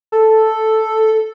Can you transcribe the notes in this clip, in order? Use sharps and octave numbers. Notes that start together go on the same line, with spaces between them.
A4